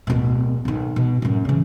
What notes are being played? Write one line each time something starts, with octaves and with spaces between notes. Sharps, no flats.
D1 B2
B1 D#3
B2
F#2 A2
C#3 E3